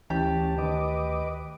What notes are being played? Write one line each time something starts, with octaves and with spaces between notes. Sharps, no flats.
D2 E3 C#4 G4 A5
D#3 B4 D#5 D6